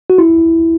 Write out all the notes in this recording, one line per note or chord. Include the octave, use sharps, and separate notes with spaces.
F#4
E4